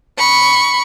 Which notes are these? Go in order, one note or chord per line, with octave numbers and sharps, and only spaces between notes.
B5 C#6